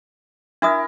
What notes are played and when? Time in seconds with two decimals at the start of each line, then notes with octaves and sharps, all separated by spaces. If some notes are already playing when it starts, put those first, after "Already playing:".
0.62 D4 E4 A#4 E5 D#6